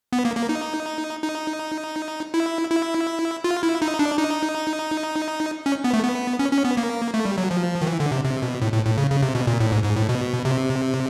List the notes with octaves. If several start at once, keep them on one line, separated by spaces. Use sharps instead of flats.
B3
A#3
A#3
D#4
D#4
E4
E4
F4
E4
D#4
D4
D#4
C#4
B3
A3
B3
C#4
C#4
B3
A#3
A3
G3
F#3
F3
D#3
E3
D3
C3
C3
B2
A2
A2
A2
C#3
C#3
C3
B2
A#2
A2
G#2
G#2
A2
B2
C3